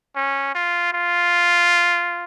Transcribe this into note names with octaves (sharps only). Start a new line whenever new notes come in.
C#4
F4
F4